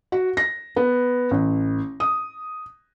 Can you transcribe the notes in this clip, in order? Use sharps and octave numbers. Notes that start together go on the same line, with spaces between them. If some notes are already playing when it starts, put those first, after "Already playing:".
F#4
A#6
B3
A1
D#6